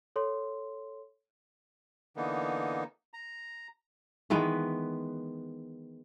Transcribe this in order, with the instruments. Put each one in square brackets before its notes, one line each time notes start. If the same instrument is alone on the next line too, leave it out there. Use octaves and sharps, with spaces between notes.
[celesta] A4 C#5 C6
[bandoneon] D3 E3 A#3 B3 D#4
A#5
[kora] D#3 E3 G#3 B3